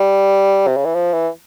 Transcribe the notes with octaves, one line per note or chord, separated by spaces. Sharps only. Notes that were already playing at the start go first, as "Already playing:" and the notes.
Already playing: G3
C3
C#3
E3
F3
E3